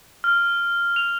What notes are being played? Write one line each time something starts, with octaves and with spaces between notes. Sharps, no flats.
F6
F7